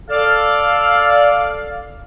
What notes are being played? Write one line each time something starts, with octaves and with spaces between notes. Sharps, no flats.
A4 D5 F5